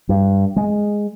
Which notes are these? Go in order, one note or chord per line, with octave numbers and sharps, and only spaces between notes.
G2
G#3